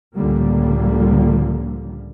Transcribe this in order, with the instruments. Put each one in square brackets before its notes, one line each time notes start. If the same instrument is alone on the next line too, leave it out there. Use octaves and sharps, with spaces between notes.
[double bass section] C#2 A2 D3 F3 G3 A#3